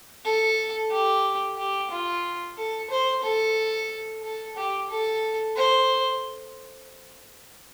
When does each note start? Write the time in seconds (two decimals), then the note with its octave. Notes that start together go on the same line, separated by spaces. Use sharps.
0.25 A4
0.91 G4
1.58 G4
1.91 F4
2.57 A4
2.90 C5
3.23 A4
4.23 A4
4.56 G4
4.90 A4
5.56 C5